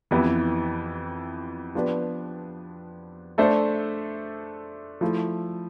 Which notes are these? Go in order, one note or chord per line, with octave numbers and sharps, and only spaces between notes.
F2 E3 B3 E4 G4
F3 B3 D4 G4 B4
A3 D4 A4 C5 E5
F3 A3 E4